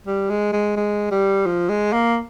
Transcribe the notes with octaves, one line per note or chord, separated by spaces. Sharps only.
G3
G#3
G#3
G#3
G3
F3
G#3
A#3